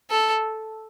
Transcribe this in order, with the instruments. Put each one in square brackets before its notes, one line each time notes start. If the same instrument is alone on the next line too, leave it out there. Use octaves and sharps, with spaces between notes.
[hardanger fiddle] A4